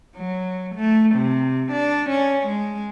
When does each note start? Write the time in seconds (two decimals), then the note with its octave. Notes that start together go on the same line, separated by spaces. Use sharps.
0.15 F#3
0.75 A3
1.15 C3
1.72 D4
2.10 C#4
2.47 G#3